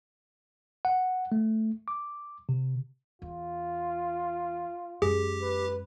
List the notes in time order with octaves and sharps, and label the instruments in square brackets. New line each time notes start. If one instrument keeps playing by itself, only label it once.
[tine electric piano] F#5
A3
D6
C3
[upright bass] E2 [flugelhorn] F4
[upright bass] F#2 G#3 [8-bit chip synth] G4 [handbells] G#4
[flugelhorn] B4